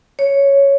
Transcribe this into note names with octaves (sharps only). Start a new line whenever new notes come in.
C#5